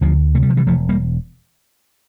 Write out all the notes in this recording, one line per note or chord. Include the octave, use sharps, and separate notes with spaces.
D2 D3 F3
C3 A3
G3
F3
E3 G3
E1 F3 A3
G3 A#3